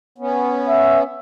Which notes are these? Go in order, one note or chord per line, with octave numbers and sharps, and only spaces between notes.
B3 C#4
E5